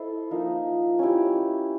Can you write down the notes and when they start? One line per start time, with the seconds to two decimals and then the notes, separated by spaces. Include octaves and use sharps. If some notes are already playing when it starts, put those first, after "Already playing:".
Already playing: E4 A4 C5 D#5
0.31 F3 A#3 D#4
0.99 C#4 E4 G4